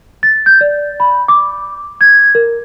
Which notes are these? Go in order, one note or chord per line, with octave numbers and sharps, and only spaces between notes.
A6
G6
D5
B5
D6
G#6
A#4